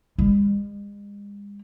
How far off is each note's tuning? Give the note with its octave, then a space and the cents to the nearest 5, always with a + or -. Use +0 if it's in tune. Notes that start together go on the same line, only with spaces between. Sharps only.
G#3 -40